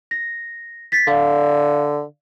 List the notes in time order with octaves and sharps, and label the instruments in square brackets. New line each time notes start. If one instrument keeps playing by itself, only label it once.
[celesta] A#6
A6 B6
[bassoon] D3 [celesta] D5 F5